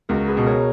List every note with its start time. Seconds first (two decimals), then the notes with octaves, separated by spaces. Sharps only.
0.09 C#2 F#4 A#4
0.28 G#4 B4
0.37 B2
0.46 A#4 C#5